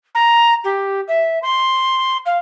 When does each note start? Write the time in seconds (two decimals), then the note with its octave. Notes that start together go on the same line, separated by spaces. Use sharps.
0.15 A#5
0.64 G4
1.08 E5
1.42 C6
2.26 F5